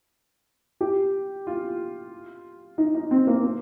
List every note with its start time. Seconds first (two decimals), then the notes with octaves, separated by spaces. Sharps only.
0.81 G4
1.47 F4
2.78 D#4
2.95 D#4
3.11 C4
3.27 A#3
3.44 A#3